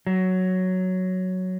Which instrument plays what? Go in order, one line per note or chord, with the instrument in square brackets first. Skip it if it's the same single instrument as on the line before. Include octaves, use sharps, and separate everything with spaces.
[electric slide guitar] F#3